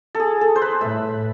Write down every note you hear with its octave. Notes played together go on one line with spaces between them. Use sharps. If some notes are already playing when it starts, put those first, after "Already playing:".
A4
G#4
A4
C5
B4
A2 E5